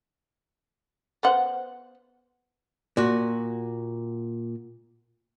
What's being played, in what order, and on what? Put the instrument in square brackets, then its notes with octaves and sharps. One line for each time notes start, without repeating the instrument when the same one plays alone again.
[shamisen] B3 C5 F#5
[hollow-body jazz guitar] A#2 F#4